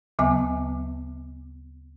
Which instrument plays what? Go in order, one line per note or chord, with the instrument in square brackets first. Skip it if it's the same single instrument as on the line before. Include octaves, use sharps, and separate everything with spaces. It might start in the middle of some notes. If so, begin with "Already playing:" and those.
[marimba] D2 C#3 F#3 B3 E5 G#5